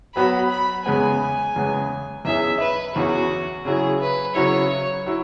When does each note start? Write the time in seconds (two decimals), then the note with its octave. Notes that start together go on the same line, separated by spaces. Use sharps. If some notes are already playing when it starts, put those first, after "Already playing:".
0.15 F#3 B3 F#4 B5
0.51 B5
0.86 E2 C#3 G#3 B3 G#5
1.56 E2 C#3 G#3 B3
2.25 E2 E3 C#4 G#4 E5
2.60 B4
2.96 E2 E3 C#4 F#4 G#4
3.65 C#3 F#3 E4 G#4
4.01 B4
4.35 C#3 F#3 E4 C#5
5.06 F#3 E4